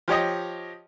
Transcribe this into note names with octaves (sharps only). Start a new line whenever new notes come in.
F3 G4 C#5 D#5